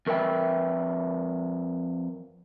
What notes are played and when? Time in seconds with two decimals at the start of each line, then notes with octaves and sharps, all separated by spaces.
0.06 F2 A#4 B4 E5 G5